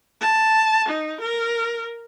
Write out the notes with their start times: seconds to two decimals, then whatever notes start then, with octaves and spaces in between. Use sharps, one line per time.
0.21 A5
0.89 D#4
1.21 A#4